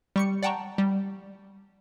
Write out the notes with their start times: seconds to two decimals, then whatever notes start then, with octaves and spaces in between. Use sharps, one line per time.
0.16 G3 C#6 C#7
0.43 D5 F#5 G5 A5 A#5 C#6
0.78 G3